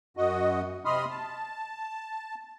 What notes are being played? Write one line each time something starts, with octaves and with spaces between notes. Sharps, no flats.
F#2 F#4 D#5
C3 D#5 B5 C6 D#6 F6
A5